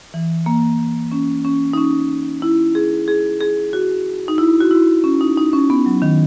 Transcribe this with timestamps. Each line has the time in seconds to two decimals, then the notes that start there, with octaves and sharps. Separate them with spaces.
0.14 E3
0.46 A#3
1.12 C#4
1.45 C#4
1.73 D#4
1.77 C#4
2.42 E4
2.75 G#4
3.08 G#4
3.41 G#4
3.73 F#4
4.28 D#4
4.38 E4
4.61 F#4
4.71 E4
5.04 C#4
5.21 D#4
5.37 D#4
5.53 C#4
5.70 B3
5.86 F#3
6.02 D#3